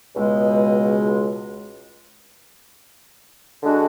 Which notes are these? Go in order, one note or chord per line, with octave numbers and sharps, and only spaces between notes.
C#2 B2 G#3
D3 G#3 D4 F#4